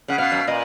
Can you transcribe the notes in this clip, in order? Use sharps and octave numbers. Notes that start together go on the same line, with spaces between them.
C#3 F#5
B2 F5
F#2
A#2 D#5